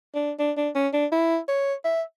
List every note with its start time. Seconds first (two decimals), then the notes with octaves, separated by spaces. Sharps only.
0.15 D4
0.39 D4
0.57 D4
0.75 C#4
0.93 D4
1.12 E4
1.48 C#5
1.85 E5